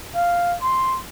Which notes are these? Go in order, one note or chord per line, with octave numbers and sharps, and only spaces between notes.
F5
C6